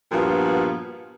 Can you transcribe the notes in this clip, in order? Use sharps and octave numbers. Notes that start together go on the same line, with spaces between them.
G2 A#2 F3 B3 F4 F#4